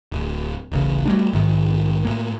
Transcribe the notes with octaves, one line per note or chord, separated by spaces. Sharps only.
D1
D1 A1 C#3
F#3 G3 A3 D4
A#1 G#2 D#3
A2 A#3